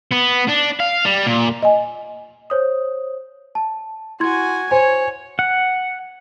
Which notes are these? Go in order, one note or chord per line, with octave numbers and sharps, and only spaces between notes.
B3
D4
F5
G3
A#2
D#5 G#5
C5 C#5 D#6
A5
E4 F#4 G#5 C6 G#6
C5 C#5 G#5
F#5